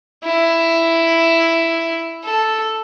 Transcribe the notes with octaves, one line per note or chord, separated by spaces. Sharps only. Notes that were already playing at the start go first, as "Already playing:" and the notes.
E4
A4